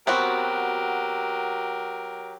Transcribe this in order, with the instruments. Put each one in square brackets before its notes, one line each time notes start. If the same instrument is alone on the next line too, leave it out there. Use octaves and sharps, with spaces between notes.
[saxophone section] F#3 G4 A#4 [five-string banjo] B3 C4 F#4